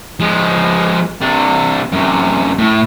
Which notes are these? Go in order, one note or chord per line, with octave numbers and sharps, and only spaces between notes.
F3 G#3
C3 D4
F#2 C3
A2